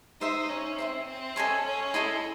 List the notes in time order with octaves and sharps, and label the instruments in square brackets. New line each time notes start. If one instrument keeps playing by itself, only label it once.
[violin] D#4 [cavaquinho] C5 E5 C6
[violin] C#4
[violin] C4 [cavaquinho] C5 E5 C6
[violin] C4
[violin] C#4 [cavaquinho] A4 D#5 G#5 C6
[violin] C#4
[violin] E4 [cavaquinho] A4 D#5 G#5 C6